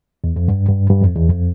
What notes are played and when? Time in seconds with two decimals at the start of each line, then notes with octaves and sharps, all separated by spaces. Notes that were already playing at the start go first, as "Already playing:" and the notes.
0.24 E2
0.36 F2
0.48 G2
0.69 G2
0.90 G2
1.02 F2
1.16 E2
1.29 F2